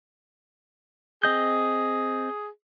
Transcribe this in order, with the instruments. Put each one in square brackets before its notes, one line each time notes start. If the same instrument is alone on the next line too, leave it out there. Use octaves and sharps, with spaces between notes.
[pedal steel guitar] C4 D#5 G6 [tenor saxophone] G#4